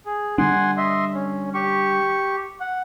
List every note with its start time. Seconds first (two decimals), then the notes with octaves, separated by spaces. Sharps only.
0.06 G#4
0.38 D3 G3 D4 F#5 G#5 C6
0.77 D#5 E5 C6
1.14 C#4
1.54 G4 C#6
2.60 F#5